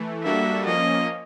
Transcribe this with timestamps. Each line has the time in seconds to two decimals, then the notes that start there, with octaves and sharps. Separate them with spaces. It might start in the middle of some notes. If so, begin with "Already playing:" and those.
Already playing: E3 A3
0.24 G3 A#3 D4 F#4 A4 E5
0.65 F3 A#3 C#4 D#5